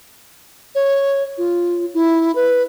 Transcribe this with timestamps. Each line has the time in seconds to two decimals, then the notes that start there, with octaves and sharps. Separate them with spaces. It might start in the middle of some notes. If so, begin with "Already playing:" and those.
0.75 C#5
1.38 F4
1.94 E4
2.35 B4